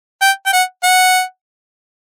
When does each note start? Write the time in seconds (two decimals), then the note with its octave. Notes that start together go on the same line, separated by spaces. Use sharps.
0.22 G5
0.46 G5
0.53 F#5
0.83 F#5